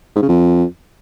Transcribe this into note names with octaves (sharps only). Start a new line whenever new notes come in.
G#2
C#3
F2